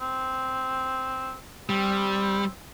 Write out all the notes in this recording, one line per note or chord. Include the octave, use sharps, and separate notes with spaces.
C4
G3 C4